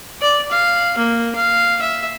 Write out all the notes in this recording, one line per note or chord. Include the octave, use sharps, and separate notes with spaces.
D5
F5
A#3
F5
E5